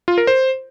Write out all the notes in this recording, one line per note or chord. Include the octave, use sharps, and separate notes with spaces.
F4
A#4
C5